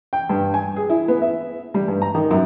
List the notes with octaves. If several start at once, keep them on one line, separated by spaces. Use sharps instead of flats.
G5
G2
G#5
G#4
E4
B3
E5
G3
G2
A#5
D#3
F#2